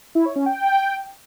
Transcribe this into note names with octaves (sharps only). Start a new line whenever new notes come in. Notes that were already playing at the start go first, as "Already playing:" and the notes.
E4
C#5
C#4
G5